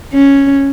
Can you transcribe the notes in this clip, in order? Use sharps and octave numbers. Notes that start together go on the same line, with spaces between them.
C#4